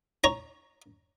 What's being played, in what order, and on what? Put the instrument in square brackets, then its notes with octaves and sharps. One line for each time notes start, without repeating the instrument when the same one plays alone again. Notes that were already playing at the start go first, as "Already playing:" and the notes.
[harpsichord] C#5 A#5